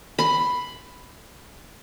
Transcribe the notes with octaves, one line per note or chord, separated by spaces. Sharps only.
B5 C6